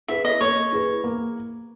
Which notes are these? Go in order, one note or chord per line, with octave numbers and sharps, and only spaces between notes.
E4 G#4 B4 E5
D#5
A#3 C#5
E4 G#4 B4
A#3